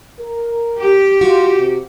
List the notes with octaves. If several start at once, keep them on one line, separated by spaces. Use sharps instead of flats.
A#4
G4
F4 F#4
C3